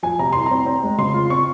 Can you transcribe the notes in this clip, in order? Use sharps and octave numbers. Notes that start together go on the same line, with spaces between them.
F3 G#5
C3 A#5
C2 C6
C4 A#5
C4
G#3
C#3 C6
F4
C4 C#6